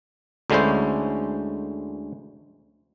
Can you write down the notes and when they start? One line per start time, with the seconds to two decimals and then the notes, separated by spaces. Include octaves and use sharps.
0.50 D2 D3 G#3 C#4 E4 C5